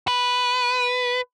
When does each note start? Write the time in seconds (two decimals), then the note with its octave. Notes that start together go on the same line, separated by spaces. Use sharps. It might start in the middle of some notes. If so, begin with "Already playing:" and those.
0.08 B4